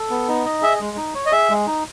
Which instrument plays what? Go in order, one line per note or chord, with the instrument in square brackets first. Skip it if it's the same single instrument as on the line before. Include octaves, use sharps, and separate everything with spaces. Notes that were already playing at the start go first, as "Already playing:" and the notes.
Already playing: [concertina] A4
B3
D#4
D#5
[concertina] G#4 [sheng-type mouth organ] E5
[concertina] G#3
D#4
C#5
[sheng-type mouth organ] D#5
[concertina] G#4 [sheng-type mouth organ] E5
[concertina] G#3
D#4